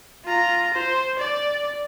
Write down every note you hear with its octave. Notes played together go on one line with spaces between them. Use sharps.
F4 A#5
C5
D5